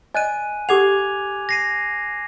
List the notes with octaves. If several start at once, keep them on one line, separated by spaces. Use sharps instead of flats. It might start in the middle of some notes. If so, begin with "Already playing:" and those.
D5 D#5 G#5 F#6 D#7
G4 A4 F#5 D6 G#6 F7
A#6 C7 D#7